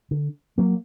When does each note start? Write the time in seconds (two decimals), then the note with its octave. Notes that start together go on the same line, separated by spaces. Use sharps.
0.11 D3
0.58 F#3 A#3